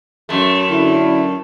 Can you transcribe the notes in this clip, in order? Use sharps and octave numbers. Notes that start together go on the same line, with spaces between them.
F#2 A3
D3 E4